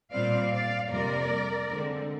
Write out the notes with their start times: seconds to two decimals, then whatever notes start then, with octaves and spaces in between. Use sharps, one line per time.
0.11 A#2 G3 C4 D5 F5
0.51 D5 F5
0.91 F2 C3 G3 A#3 A#4 D5
1.70 D3 G#3 C4